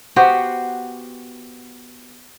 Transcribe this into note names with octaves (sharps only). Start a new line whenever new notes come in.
B3 F#4 G4 C5